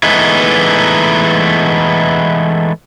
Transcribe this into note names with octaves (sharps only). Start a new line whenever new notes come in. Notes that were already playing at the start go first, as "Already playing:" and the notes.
E3 G#3 A3 B3 D#4